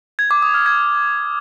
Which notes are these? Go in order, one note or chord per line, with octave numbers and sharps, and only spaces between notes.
G#6
D6
D#6
F6
G#6